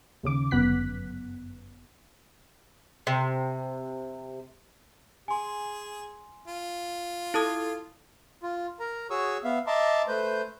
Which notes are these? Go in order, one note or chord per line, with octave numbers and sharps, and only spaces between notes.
D#2 C#3 D6
G1 F#2 B3 F#6 B6
C3
G#4 G#5 C6
F4
E4 A4 A5 D#6 G#6
F4
A#4 A#5
F#4 G#4 C#5 C#6 D#6 E6
B3 E5 F5
D#5 E5 A5 A#5 C6 D6
A3 B4 C5 G6